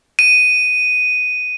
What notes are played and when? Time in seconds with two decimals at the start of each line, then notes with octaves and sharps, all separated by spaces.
0.19 D#7